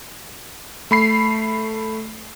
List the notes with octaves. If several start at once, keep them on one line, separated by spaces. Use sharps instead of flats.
A3 B5 C7